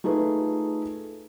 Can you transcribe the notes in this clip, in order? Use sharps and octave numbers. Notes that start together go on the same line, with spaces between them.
A3 D#4 F4 G#4 B4